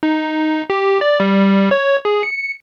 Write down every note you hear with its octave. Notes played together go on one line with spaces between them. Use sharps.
D#4
G4
D5
G3
C#5
G#4
C#7